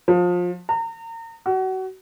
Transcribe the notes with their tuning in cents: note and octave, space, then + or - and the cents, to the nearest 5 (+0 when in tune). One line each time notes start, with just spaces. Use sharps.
F3 +25
A#5 -35
F#4 +30